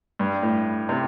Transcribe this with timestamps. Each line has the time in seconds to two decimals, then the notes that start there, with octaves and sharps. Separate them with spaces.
0.19 G2
0.42 A2
0.89 C3